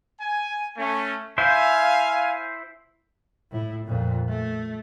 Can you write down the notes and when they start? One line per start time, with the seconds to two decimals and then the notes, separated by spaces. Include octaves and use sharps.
0.21 G#5
0.77 A3 C#4
1.38 E4 C5 E5 F5 G#5
3.51 A2 E4
3.86 F2 A#2
4.29 A3